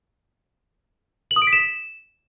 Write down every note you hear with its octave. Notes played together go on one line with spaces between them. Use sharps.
F#7
D#6
D7
B6
E7